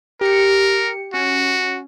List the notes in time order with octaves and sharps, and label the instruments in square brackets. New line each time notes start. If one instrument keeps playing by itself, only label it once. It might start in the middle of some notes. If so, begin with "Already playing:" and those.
[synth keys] G4 C#7 [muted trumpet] A#4
[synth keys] C#4 [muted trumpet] F#4